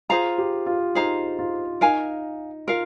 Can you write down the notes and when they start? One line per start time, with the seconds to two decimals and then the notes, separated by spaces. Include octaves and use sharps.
0.09 F4 G#4 C5 F5 A#5
0.38 G4
0.66 F4
0.95 D#4 G#4 C5 F5 A#5
1.39 F4
1.81 D#4 A#4 F5 G#5
2.67 F4 A#4 F5